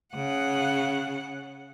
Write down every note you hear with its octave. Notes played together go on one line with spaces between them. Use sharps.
C#3 F#5